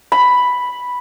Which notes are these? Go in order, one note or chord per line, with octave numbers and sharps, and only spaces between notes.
B5